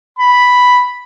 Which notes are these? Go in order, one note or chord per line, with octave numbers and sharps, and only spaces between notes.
B5